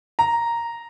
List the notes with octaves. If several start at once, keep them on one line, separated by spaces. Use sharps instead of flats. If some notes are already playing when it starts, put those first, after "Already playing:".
A#5